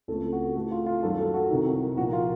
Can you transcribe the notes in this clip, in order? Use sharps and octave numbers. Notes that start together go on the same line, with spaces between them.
C#2 C#3 A3 C4 A4
F#4
A2 A3 C4
F4
F4
F#2 D#3 F#3 A4
A4
F#4
C2 C3 D#3
A#2 F3 A#3 F#4
F4